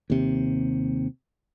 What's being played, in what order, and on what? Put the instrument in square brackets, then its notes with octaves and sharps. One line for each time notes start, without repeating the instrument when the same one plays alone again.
[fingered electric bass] D#2 C3